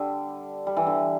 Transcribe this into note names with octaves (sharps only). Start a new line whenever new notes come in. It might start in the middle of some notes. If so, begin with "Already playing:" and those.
Already playing: D3 G3
G3
E3
D3